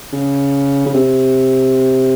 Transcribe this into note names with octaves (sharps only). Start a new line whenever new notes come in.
C#3
C#3
C3